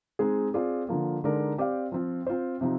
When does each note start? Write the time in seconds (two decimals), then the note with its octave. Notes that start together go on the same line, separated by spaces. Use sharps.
0.19 G#3 C4 D#4 G#4
0.54 C4 F4 G#4 D5
0.89 D3 F3 A#3
1.24 D3 G#3 D#4 A#4 D5
1.58 C4 G4 D5 F5
1.92 F3 C4 F4
2.27 C4 F4 C5
2.61 C3 F3 C4 D#4